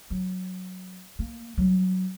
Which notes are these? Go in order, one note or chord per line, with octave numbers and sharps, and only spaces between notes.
F#3
A#3
F#3 G3